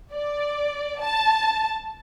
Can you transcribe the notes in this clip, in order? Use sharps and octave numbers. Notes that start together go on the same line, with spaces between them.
D5
A5